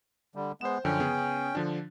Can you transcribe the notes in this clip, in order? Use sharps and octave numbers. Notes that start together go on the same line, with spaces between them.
D3 G3
G#3 B3 C5 E7
F#2 D3 F3 C#4 G5
C#3 B3 G#4
D3 F3 D4